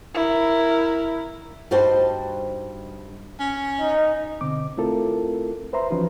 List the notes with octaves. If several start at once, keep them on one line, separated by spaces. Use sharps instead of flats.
E4 A#4
G2 G3 D#4 F#4 C5 A5
C#4
D#4
B2 D3 C4 D6
A3 C4 E4 F4 A4 A#4
B4 C5 E5 A#5 C6
E3 F3 C#4 D#4 F#4 B4